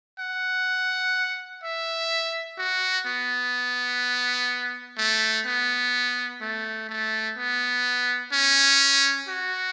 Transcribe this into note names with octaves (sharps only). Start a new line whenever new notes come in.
F#5
E5
F#4
B3
A3
B3
A3
A3
B3
C#4
F#4